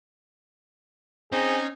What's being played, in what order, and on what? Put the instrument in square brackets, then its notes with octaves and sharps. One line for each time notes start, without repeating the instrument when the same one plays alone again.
[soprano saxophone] C4 [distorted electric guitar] C#4 [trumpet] D#4 [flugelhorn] G#4